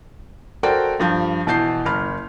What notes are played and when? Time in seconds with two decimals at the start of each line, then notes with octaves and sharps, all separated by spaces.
0.63 F#4 A4 A#4 C5 D5 G5
1.00 G2 F3 G6
1.47 B2 E3 A5 G6 C7
1.86 F#1 B5 F6